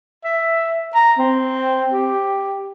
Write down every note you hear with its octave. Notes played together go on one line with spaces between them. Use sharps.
E5
A#5
C4
G4